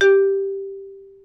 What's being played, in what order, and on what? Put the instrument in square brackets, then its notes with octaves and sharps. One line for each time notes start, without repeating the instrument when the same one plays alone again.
[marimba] G4